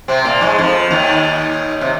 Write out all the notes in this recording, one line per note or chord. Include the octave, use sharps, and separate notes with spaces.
C3 C4
A#2 A#3
G#2 G#3
F2 F3
D#2 D#3
C3